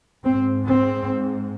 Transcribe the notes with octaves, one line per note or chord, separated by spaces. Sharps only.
G#2 C4
C4